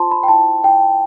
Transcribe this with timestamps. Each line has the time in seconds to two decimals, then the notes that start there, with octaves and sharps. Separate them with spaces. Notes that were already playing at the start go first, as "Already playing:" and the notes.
Already playing: F4 C5 A5 C6
0.11 B5
0.23 G5
0.28 E4 A5
0.64 E4 G5